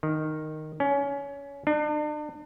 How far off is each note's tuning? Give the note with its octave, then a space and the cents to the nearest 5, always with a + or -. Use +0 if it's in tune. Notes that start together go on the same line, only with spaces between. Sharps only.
D#3 -5
C#4 +25
D4 +40